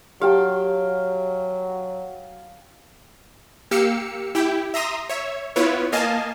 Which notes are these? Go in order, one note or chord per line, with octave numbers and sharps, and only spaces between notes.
F#3 G4 F5 G5 A5
A#3 G4 F5 E6 C#7
E4 G4 G5
E5 A#5 C6 D#6 A#6
C#5 E5
B3 E4 F4 B4 C#5
A#3 D#5 F5 G#5 A5